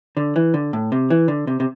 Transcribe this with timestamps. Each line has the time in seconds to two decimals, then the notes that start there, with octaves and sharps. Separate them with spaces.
0.17 D3
0.36 E3
0.54 D3
0.73 A2
0.92 C3
1.10 E3
1.28 D3
1.47 C3
1.60 C3